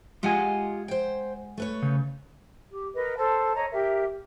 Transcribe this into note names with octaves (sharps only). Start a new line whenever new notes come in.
G#3 F4 G4 D#5 F#5 G#5
C5 G5
A3 B4 C#5
C#3
G4
A#4 B4 D#5
A4 C5 A5
C#5 D#5 A#5
G4 A#4 E5